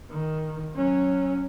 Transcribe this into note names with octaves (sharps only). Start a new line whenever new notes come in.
D#3
F#3 C#4